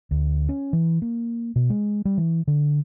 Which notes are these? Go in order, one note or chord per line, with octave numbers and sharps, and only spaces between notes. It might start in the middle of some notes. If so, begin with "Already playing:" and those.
D2
C#4
E3
A#3
B2
G#3
G3
E3
D3